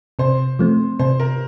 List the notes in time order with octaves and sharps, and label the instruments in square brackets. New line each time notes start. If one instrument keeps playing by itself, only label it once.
[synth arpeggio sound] C3 [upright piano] C5
[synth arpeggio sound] F3 A3 C4
[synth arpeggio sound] C3 [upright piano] C5
[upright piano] A#4